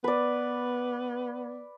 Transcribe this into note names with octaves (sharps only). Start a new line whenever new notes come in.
B3 B4 D5